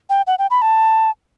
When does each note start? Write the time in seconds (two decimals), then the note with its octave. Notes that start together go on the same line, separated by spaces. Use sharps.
0.10 G5
0.27 F#5
0.39 G5
0.50 B5
0.62 A5